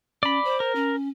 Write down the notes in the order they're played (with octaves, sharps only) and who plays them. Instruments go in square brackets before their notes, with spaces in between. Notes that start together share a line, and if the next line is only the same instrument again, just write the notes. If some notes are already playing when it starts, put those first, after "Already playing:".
[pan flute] C#4 [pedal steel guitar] D5 B5
[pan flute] C5
[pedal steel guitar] A#4
[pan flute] C#4